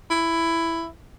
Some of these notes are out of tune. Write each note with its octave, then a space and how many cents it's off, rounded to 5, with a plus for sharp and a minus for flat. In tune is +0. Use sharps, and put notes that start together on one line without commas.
E4 +10